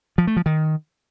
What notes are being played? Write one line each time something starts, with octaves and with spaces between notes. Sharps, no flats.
F3
A3
F3
D#3